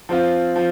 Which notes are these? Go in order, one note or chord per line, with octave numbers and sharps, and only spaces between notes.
F3 C4 F4
F3